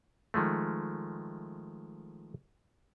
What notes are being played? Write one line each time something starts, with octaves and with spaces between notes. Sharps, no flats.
D#3 F3 G#3 A3